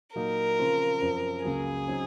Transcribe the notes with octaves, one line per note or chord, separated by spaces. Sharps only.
A#2 F#3 A#3 D#4 A#4
C#3 F3 C4 F4
F#2 F3 C4
C#2 C#3 F#3 A#3 G#4
C#3 F#3 C4 D#4